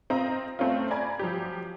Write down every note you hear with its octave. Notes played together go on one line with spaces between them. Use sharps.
C4 F4 D#5 A#5
A3 C4 C#4 F4
D5 G#5 A#5 B5 G#6
F3 F#3 G4